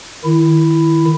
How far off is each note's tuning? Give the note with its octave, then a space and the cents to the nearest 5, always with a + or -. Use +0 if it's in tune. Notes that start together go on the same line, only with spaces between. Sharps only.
D#3 +0 E4 +5